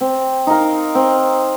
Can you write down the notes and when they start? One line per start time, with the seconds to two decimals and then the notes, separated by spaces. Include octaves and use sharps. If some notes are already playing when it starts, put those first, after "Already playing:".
0.01 C4
0.47 D#4 A#4 F5
0.95 C4